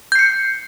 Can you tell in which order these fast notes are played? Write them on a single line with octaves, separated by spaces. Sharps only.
G6 C7 C#7